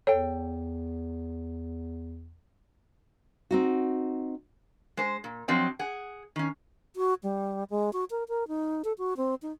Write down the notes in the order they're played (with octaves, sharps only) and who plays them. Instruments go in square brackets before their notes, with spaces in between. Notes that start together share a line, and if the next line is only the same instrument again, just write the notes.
[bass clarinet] E2 [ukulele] A4 G5 [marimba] C#5
[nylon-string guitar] C4 D#4 F#4
[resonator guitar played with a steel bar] G#3 C5
A#2
F3 F#3 C4 D#5 G5
G#4 F#5
D#3 C#4
[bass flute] F#4
G3
G#3
F#4
A#4
A#4
D#4
A4
F#4
C4
D#4